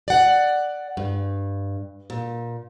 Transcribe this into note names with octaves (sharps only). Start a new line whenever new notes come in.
D5 F#5
G2
A#2